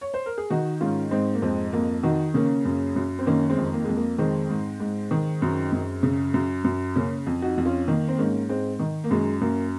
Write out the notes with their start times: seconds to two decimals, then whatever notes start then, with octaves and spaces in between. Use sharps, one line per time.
0.01 C#5
0.14 C5
0.26 A#4
0.38 G#4
0.50 D#3 D#4 F#4
0.81 G#2 C#4 F4
1.11 G#2 C4 D#4
1.34 A#3
1.42 F2 G#3 C4
1.72 F2 A#3
2.03 D#3 D#4 F#4
2.34 C#3 A#3 C#4
2.65 F#2
2.96 F#2
3.19 C4
3.26 D#3 A#3 C#4
3.50 G#3 C4
3.58 F2
3.73 A#3
3.85 F2 G#3
3.96 A#3
4.19 D#3 G#3 C4
4.50 G#2
4.80 G#2
5.11 D#3
5.42 F#2
5.72 F#2
6.03 C#3
6.34 F#2
6.64 F#2
6.96 C#3 A#3 C#4
7.26 F2
7.42 D#4 F#4
7.57 F2
7.65 C#4 F4
7.88 D#3 A#3
8.08 C4
8.18 G#2 A#3 C#4
8.49 G#2 G#3 C4
8.80 D#3
9.04 A#3
9.11 F#2 G#3
9.41 F#2 A#3